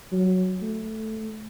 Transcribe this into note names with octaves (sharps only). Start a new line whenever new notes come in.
F#3
A3